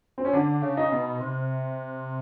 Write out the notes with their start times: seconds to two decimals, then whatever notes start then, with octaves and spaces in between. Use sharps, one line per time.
0.18 C4
0.25 C#4
0.33 D3 D4
0.62 C#3
0.77 D#4
0.92 B2
1.20 C3